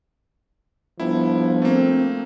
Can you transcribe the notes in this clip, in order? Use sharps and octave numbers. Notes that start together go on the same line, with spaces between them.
G1 F3 E4
A3 A#3 C4